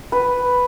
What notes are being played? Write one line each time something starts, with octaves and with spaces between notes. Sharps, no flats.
B4